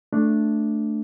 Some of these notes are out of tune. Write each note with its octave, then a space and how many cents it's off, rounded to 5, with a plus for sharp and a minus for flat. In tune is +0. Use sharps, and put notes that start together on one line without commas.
A3 +0 D4 +0